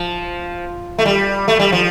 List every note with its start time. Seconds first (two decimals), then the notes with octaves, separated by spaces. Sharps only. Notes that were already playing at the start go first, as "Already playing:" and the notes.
Already playing: F3
0.99 A3
1.05 G3
1.48 A3
1.60 G3
1.72 F3